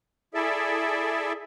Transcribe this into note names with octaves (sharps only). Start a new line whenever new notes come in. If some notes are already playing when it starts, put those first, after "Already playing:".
E4 G#4 A4 D5 E5